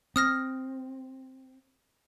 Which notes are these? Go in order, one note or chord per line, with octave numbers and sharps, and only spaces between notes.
C4 D#6 F6 A#6